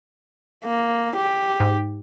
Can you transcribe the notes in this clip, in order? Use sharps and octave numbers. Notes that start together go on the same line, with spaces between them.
A#3
G4
G#2